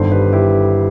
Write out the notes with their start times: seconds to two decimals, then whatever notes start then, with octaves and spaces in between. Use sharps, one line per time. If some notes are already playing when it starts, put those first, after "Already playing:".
Already playing: G1 G2 D#3 A4 C5
0.12 G4 B4
0.32 E4 G4